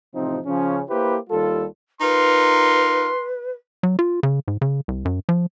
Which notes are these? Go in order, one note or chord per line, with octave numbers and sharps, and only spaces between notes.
A1 C3 F3 C4 D#4
C#3 F3 C#4
A#3 E4 G4 B4 C5
D#2 G3 F4 A4
D#4 F4 A#4 B4 C6
F#3
F4
C#3
G#2
C#3
C2
F#2
F3